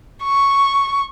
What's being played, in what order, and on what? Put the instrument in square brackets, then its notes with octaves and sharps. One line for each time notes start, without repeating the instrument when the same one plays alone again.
[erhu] C#6